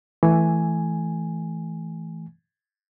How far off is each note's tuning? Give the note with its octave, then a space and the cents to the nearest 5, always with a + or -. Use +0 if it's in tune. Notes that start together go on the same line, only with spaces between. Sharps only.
E3 +0 A3 -10 G#5 +0